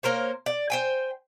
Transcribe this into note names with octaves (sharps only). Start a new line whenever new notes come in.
A#3 A#4 C5 C#5
D5
C5 G5 G#5